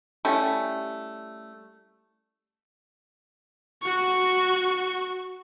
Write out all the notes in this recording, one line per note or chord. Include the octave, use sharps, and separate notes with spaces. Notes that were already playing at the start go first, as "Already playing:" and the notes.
G3 A3 C#4 E4
F#4 C#6